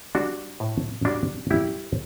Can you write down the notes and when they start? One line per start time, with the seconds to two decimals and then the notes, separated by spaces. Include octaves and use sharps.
0.15 G3 D4 F#4
0.60 A2
1.05 G3 D4 F#4
1.50 G3 E4 G4